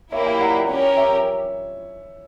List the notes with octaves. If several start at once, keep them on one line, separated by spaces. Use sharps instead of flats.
A#3 E4 G4 C#5 E5
E5 G5
D5 F#5
C#4 G4 A#4
C#5 E5